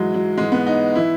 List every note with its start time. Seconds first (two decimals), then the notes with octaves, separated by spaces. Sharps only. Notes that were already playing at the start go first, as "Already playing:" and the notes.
Already playing: G#2 E3 F#3 G#3
0.14 F#3
0.37 G#2 E3 G#3
0.52 B3
0.66 D#4
0.95 E3 E4